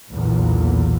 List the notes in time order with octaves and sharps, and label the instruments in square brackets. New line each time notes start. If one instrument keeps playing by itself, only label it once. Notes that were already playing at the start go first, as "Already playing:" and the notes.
[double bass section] B1 E2 A#2